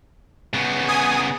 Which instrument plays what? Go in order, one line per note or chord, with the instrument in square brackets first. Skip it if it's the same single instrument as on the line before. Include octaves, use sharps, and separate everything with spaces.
[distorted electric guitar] C#3 B3
[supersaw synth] G#5 D#6